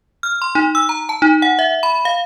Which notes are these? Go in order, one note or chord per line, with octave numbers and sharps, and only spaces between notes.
F6
C6
D#4
E6
A#5
A5
D#4
F#5
E5
B5
F5